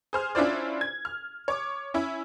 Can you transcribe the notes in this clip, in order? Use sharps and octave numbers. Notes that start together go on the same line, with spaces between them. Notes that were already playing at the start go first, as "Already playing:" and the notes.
G#4 C5 F6
C#4 D4 E4 F4 C5 D5
G#6
F6
C#5 D6
C#4 E4